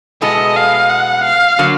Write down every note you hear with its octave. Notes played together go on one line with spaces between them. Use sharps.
B2 G#3 B3 E4 A4 D#5
F5
F#5
F5
D3 F#3 A#3